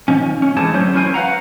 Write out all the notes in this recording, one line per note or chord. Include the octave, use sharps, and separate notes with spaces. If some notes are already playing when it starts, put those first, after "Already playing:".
D#3 F3 C#4
C#4
G#2 E3 A3 G#4 A5
D3 F#3 A3 C#4 C5
C#4 E4 F#4 A#4 C5 G#5
B4 F5 F#5 A#5